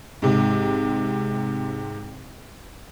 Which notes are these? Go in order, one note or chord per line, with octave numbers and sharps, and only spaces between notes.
G#2 C3